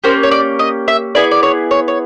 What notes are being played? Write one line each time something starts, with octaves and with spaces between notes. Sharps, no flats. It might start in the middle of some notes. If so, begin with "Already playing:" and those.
A#3 C#4 G4 C5
C#5
D5
D#5
E5
B3 E4 G#4 D5
D5
C#5
C#5
C#5